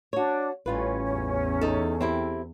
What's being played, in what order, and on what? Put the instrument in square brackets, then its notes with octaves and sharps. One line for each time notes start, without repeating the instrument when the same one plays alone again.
[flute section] D4 [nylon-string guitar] F#4 C#5
[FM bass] A1 [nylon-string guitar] G3 F4 B4 [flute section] C#4
[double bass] E2
[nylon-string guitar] D#4 A4
C4 E4 G4